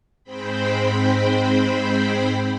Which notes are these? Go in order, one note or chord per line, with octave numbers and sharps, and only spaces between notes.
G#2 G#3 C4 C5 G5 B5